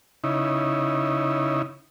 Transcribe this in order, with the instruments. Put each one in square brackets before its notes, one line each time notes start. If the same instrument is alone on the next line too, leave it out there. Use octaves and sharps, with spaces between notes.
[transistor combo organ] C#3 D#4 E4